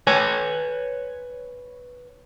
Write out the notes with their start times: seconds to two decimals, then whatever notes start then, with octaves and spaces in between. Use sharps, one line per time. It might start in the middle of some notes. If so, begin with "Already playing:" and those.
0.07 B4 C#5 G#5